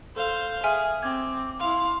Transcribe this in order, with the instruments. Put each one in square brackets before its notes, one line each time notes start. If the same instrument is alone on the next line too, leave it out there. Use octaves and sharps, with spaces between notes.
[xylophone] A4 [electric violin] C5 F5
[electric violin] G#4 [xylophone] E5 G#5 F6
[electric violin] C4 [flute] D6 [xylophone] G#6
[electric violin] E4 F5 [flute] C6